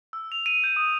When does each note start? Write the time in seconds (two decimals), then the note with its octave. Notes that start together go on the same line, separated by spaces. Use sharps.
0.13 E6
0.32 F7
0.46 D#7
0.64 G6
0.76 D#6